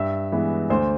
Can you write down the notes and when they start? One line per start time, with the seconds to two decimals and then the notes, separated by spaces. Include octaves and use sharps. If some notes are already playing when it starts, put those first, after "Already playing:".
Already playing: G2 E5
0.32 E3 G#3 B3
0.70 D2 C5